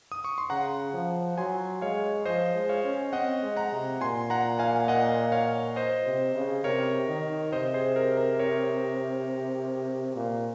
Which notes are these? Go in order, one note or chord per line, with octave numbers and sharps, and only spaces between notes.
D#6
C#6
C6
C#3 F#5 A#5
F3
F#3 G#5 C6
G#3 C#5 F5
F3 C5 D#5
G#3
C#5 F5
C#4
C4 D#5 F#5
G#3
F#5 A#5
C3
A#2 G#5 C6
F#5 A#5
F5 G#5
D#5 F#5
C#5 F5
C5 D#5
C3
C#3
C3 A#4 C#5
D#3
C3 C5 D#5
G#4 C5
A#4
A#4
A#4 C#5
A#2